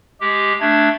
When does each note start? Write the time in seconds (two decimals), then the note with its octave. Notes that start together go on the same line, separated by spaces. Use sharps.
0.21 G#3 G4
0.61 A3 D4 G#6